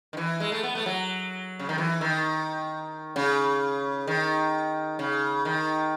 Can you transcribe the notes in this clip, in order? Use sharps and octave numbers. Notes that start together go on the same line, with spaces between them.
D#3
E3
G#3
A3
B3
A3
F#3
C#3
D#3
E3
D#3
C#3
D#3
C#3
D#3